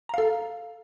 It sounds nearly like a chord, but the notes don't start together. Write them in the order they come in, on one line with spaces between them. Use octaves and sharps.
A#5 F5 A4